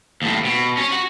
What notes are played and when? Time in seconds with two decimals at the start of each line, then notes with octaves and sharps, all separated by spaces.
0.22 D#2 A2
0.45 B2
0.77 C#4 C#5
0.92 F#4